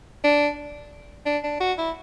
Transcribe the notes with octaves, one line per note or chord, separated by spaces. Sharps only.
D4
D4
D4
F#4
E4